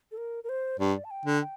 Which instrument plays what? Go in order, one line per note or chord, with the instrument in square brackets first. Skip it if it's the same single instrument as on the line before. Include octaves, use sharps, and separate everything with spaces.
[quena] A4
A#4
A#4
C5
[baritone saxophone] G2 [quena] D5
[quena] A5
G5
[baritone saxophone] D3
[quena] G5